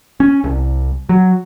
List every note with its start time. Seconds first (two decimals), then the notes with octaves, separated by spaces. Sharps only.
0.20 C#4
0.44 C2
1.09 F#3